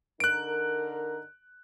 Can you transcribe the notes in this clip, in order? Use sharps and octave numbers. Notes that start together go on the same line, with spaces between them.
D3 D#4 A#4 F#6 D7